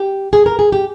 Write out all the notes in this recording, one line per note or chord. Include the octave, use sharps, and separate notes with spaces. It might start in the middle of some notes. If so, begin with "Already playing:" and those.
Already playing: G4
G#4
A#4
G#4
G4